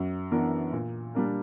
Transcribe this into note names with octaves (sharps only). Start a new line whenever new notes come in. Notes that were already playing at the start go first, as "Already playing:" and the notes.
Already playing: F#2
E3 B3 D4 A#4
A#2
G3 A#3 D4 A#4